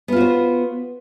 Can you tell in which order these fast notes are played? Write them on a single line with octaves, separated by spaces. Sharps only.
B3 F4 F#4 C5